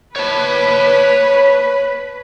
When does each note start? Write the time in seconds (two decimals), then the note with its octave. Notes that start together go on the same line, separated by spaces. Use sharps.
0.16 B4 C#5 A5